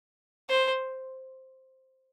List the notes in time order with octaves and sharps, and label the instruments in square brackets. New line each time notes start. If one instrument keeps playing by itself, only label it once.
[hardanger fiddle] C5